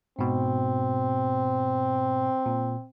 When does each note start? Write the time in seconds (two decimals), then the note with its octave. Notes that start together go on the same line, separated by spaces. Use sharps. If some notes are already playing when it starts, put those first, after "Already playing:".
0.19 G#2 B2 C4
2.46 A#2